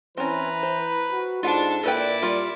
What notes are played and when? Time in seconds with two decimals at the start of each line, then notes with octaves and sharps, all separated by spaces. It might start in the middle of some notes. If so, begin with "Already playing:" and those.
0.17 E3 C4 C#4 B4 A#5
0.63 C5
1.12 F#4
1.43 G#2 D4 F4 A4 F#5
1.83 A#2 E4 A4 B4 D5 G5
2.22 G3 F4 A#4